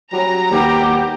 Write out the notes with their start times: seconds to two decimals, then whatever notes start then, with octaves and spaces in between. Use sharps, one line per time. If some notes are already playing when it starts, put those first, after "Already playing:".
0.13 F#3 G3 C#4 A#5
0.51 D#2 G3 B3 D#4 G4